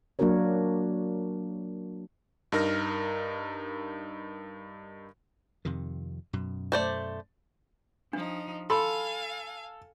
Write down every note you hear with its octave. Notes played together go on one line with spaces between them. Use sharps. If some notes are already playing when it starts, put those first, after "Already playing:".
F#3 A#3 D4 F#4 A#4 C#5
G2 D#4 A#4 F6 A#6
F2 C3 D#3
F#2 B2
A3 C5 D5
F3 D4 D#4
A4 F5 G#5 B5 C6